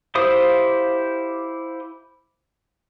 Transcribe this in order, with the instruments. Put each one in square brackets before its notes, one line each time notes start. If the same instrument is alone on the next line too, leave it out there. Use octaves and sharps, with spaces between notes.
[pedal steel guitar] E4 G4 C5 F5 D#6